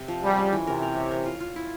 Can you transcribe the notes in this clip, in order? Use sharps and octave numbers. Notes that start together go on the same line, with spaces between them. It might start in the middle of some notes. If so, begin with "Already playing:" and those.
Already playing: C3
F3
G3 G#3
C#4
E3
C3 A#4
A#4
C#5
A#4
F4
F4
E4